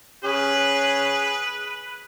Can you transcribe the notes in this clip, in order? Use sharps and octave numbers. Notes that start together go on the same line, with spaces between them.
C#4 G#4 B4